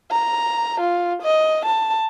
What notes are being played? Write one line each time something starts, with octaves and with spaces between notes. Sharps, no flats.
A#5
F4
D#5
A5